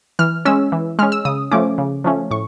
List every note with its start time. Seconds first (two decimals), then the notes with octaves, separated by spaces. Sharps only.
0.19 E3 F6
0.45 G#3 C#4 E6
0.72 E3
0.99 G#3 C#4 F6
1.12 E6
1.25 C#3 D#6
1.51 F3 A3 C#4 D6
1.78 C#3
2.04 F3 A3 C#4
2.31 A2 C#6